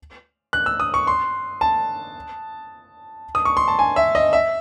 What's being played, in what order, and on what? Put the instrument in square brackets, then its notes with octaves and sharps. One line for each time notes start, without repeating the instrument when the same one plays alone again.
[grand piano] F#6
E6
D#6
C#6
C6
A5
D#6
C#6
C6
A5
G#5
E5
D#5
E5